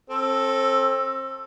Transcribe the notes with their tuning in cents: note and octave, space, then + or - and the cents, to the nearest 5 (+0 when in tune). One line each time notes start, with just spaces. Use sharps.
C4 +30 A4 +0